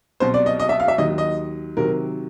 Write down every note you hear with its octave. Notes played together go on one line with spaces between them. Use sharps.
C2 B2 F#3 C5
D5
D#5
D#5
E5
F5
E5
D#2 D#3 F#3 D#5
D#5
C3 D#3 F#3 A#4